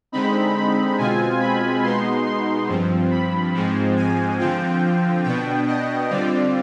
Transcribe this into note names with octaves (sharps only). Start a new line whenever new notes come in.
D3 G#3 C4 D#4 B5
B5
B2 G#3 C4 F4 G#5
B5
B2 G#3 B3 D#4 C6
C6
G2 F3 C4
B5
G#2 F3 G#3 C4
G#5
D3 F3 C4 F4 G5
B2 B3 D4 G5
D#5
D3 G3 C4 F4 D5